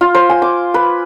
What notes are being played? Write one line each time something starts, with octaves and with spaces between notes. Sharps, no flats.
F4
C5
G#5
D6
B4